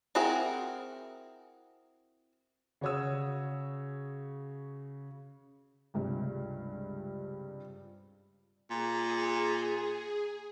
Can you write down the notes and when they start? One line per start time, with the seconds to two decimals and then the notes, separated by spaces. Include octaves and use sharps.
0.15 C4 E4 F#4 G#4 A#4
2.81 C#3 F#4 C#5 D#6 E6
5.94 C#2 G2 C3
8.70 A#2 G#4